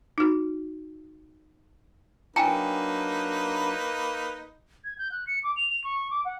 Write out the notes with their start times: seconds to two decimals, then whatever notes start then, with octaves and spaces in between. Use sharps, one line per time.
0.18 D#4 F#4
2.36 F#3 A#3 D4 D#4 B4 G5 G#5 A#5
4.84 G#6
4.98 G6
5.11 F#6
5.27 C#7
5.44 D6
5.56 F7
5.70 F7
5.84 C#6
6.11 D6
6.25 F#5